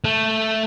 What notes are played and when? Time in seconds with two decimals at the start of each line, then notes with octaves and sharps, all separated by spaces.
0.04 A3